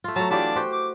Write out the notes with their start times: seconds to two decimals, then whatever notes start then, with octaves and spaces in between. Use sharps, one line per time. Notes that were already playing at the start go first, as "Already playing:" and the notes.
0.04 A3 F4
0.16 F#3 A3 A5 A#5
0.31 E3 B3 D4 F4 G4 A5
0.56 F#4 G4 C5
0.73 D6